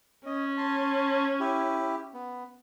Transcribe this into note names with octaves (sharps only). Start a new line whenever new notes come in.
C#4 D#5
A5 C6
E4 G4
B3